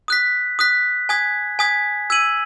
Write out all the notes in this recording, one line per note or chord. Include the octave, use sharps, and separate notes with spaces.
D#6 F#6 B6
D#6 F#6 B6
G#5 D#6 G#6 B6
G#5 D#6 G#6 B6
E6 G#6 D#7 F#7